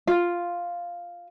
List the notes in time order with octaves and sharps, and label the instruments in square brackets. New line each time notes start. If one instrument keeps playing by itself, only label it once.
[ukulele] F4